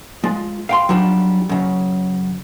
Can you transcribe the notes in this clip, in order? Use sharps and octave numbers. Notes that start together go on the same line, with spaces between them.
G#3 F4
F5 G5 C6
F#3 G3 D4 D#4 F4
F#2 C#3